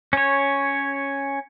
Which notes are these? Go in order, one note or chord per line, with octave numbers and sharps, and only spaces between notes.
C#4 C#5